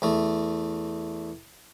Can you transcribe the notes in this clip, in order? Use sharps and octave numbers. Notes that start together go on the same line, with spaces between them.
E2 A3